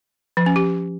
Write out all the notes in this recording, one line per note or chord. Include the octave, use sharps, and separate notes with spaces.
F3
C#4
G4